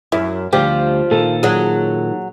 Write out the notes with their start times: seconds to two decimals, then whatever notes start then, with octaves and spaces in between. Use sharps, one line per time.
0.12 F#2 E4
0.53 D2 F3 G3 G4
1.11 A#2 D#3 A4
1.43 F#3 G#4